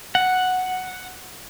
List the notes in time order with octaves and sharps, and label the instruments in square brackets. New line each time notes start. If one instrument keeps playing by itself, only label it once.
[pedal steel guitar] F#5